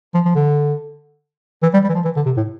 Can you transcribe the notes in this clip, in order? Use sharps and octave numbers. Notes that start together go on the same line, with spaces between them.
F3
F3
D3
E3
G3
G3
E3
F3
E3
D3
C3
A2